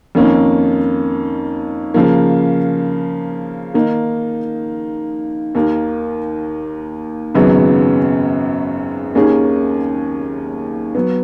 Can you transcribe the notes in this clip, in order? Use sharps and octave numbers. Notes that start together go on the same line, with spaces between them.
F2 D#3 A#3 C#4
C#3 F3 A#3
D#3 A#3 D#4
D#2 D#3 A#3
G#1 F#2 C#3 F#3 B3
D#2 D#3 A#3 C#4 G#4
F#3 B3